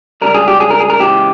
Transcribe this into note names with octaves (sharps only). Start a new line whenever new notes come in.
C#2 C#3 G3 A#4
G#4
G4
G#4
A#4
G#4
A#4
C#2 C#3 E3 G#3 G4